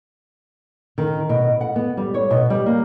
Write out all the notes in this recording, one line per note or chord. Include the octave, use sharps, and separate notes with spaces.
D#3
B2
F#5
B3
G3
C#5
B2
G3
A#3